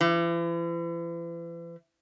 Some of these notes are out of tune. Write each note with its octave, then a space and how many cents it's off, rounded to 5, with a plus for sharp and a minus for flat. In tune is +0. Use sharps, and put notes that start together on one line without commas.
E3 +40